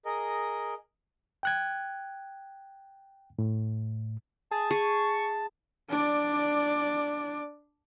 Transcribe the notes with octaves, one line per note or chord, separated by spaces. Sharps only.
G#4 A#4 D#5
G5 F#6 G#6
A2
G#4 A5
G#4 C#6
D4 D5